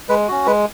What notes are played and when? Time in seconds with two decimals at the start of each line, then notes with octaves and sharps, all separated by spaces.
0.09 G#3 B4
0.28 C#4 F#4
0.46 G#3 B4